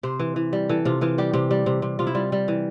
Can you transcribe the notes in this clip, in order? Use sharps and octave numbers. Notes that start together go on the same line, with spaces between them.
C3 C5
E3
E3
G3
E3 A4
C3 F4
E3 F4
G3 G4
C3 G4
G3
C3
C3
C3 F4
E4
G3 F4
G3
E3